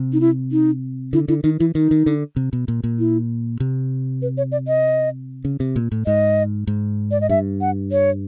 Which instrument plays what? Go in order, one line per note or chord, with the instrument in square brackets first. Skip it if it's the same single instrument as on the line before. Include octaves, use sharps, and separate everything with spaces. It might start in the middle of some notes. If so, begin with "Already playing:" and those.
Already playing: [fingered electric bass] C3
[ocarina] D#4
E4
D#4
[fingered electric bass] D3 [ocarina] E4
[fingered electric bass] D3 [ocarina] E4
[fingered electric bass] D#3 [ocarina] D#4
[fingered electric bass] E3 [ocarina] E4
[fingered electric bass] D#3 [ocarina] D#4
[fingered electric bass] D#3
D3
C3
B2
A#2
A#2
[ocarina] E4
[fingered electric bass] C3
[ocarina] B4
C#5
D5
D#5
[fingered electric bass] C#3
C3
A#2
A2
[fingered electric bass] G#2 [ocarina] D#5
[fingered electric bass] G#2
[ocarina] D5
D#5
[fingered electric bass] G2 [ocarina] E5
[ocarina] F#5
C#5